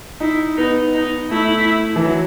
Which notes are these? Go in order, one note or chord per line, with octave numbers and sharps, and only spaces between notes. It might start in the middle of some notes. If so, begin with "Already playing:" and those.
D#4 E4
B3 D#4
D#4
A3 E4
E3
F#3